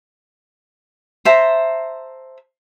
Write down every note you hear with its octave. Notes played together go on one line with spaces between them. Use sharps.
C5 E5 A5 A#5